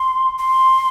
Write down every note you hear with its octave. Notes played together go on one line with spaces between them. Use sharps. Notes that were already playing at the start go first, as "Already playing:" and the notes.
Already playing: C6
C6